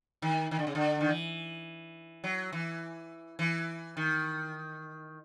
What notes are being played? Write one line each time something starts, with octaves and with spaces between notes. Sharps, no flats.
D#3
D#3
D3
C#3
D3
D#3
E3
F#3
E3
E3
D#3